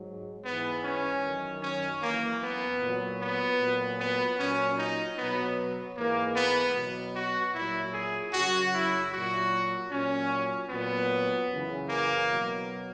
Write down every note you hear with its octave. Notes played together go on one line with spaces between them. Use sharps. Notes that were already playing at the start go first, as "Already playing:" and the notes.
Already playing: G#2 F#3
G#2 E3 B3
C#4
F#2 D#3 F#3
C#4
F#2 E3 A#3
B3
A#2 F#3
B3
A#2 F#3
B3
A#2 F#3 C#4
D#4
B2 F#3 B3
G#2 E3 A#3
B3
B2 F#3
F#4
A#2 F#3 E4
G#4
F#2 C#3 F#3 F#4
E4
A#2 F#3 F#4
A#2 F#3 C#4
A#2 F#3 B3
F#2 C#3 E3
A#3
B2 F#3